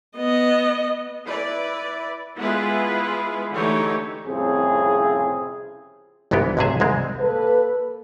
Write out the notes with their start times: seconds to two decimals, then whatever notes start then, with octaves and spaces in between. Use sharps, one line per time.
0.17 B3 D#5
1.25 E4 B4 D5
2.37 G#3 B3 E4 F4 G#4 B4
3.52 D3 E3 A3 D#4 G4 C#5
4.25 C2 F2 A2 C#3 C4 G#4
6.31 G1 C2 E3 G#3 B3 G4
6.57 B1 A2 C3 F#4 G#4 E5
6.80 C2 G#2 G#3 C4
7.19 A#3 A4 B4